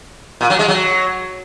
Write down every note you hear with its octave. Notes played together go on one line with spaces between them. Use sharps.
A#2
F#3
G#3
F#3